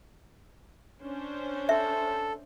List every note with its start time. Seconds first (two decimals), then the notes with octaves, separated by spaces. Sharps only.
1.02 C#4 D4 C5
1.69 A4 E5